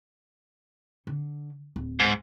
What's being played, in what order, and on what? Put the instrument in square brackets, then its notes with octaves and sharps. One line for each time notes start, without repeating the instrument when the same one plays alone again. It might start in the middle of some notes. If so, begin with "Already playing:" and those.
[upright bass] D3
D1
[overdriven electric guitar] G#2